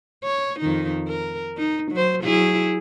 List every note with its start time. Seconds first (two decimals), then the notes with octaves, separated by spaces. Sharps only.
0.24 C#5
0.60 F2 D#3 D#4
1.08 A#4
1.58 D#4
1.92 F#3 C5
2.23 F#3 E4 G#4